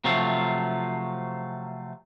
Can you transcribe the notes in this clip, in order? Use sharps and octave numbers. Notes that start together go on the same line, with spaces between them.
C3 F3 F#3 A3 F4